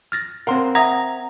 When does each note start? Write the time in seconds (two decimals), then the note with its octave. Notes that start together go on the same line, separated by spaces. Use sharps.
0.12 F6 A6 A#6
0.47 C4 A#4 F5 F#5 C6
0.75 E5 F#5 A#5 D#6 G#6